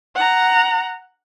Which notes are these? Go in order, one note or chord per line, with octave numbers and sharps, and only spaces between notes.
F#5 A#5